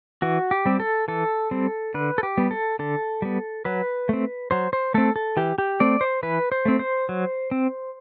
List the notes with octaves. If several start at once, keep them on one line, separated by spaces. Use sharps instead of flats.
E3 F#4
G4
G3 C4
A4
E3 A4
G3 C4
D3 B4
A4
G4
G3 B3
A4
D3 A4
G3 B3
F#3 B4
A3 C4
F#3 C5
C5
A3 C4 A4
A4
E3 G4
G4
A3 C4 D5
C5
E3 B4
C5
A3 C4
C5
F#3
C4